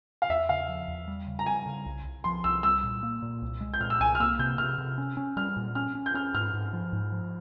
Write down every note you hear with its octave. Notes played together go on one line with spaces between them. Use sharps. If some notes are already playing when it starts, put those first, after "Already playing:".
F5
E2 E5
C#3 F5
F3
E2
G3
C#3
A#5
G3 G#5
C#3
C2
C2
F3 C6
C2 E6
G3 E6
A#2
A#3
A#2
C2
G#3
G6
A#2 F6
E6
C2 G#5
F6
A#3 E6
C3 G6
C3 F6
C3
C#4
C#4
G3 F6
A#2
C#4 F6
C#4
G6
C#4 F6
G#2 F6
G#2
F3
G#2
F3